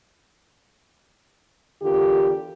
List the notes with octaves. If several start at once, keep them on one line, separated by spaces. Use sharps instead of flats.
E2 D3 F4 G4 A#4